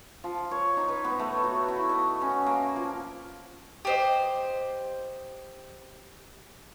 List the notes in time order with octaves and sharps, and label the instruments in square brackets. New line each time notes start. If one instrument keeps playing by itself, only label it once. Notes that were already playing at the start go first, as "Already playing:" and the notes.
[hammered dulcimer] F3
C#5
D#4
B4
B3
A3
F#4
E4
D#5
C#4
A#3
F3
[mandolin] G4 C5 D#5